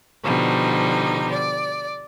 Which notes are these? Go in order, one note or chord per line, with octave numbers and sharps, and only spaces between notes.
B2 D3 F3 G3 D#4
D5